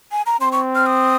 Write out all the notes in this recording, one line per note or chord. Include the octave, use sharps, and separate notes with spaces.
G#5
A#5
C4 C6
C#6
F6
D#6